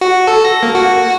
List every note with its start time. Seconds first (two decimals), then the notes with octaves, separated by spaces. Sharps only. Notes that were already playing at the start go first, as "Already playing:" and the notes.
0.01 F#4
0.27 A4
0.45 A#6
0.63 A#3
0.75 F#4